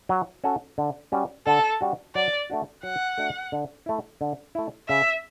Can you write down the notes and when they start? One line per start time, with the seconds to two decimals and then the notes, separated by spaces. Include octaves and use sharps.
0.09 F#3
0.44 C#4 F#4 A4
0.78 D3
1.12 G3 C#4 F#4
1.47 D3 A4
1.81 G3 C#4 F#4
2.15 F#3 D5
2.50 A3 D4 F#4
2.83 F#3 F#5
3.18 A3 D4 F#4
3.52 D3
3.86 A3 E4
4.21 D3
4.55 A3 E4
4.88 C#3 E5